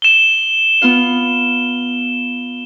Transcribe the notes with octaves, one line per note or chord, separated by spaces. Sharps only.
E7 G7
B3 F4 F5